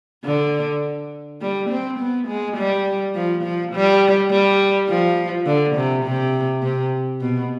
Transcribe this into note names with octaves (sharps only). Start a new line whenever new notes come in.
D3
G3
C4
B3
G#3
G3
F3
F3
G3
G3
F3
D3
C3
C3
C3
B2